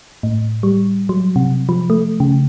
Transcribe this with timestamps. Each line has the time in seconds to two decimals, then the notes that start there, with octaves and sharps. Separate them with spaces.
0.23 A2
0.63 G3
1.09 F#3
1.36 C3
1.69 F3
1.90 A3
2.20 C#3